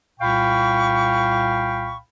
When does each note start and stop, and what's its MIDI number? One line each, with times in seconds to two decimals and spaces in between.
0.20 1.97 36
0.20 1.97 46
0.20 1.97 77
0.20 1.97 79
0.20 1.97 83
0.20 1.97 85